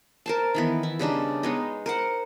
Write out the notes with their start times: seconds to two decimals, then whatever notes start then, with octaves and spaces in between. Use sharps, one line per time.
0.26 A#4 C5 A5
0.55 D#3 E3 B3
0.83 E4
0.99 C#3 G3 D4 D#4
1.43 G#3 B3 D#4
1.86 A#4 C5 F#5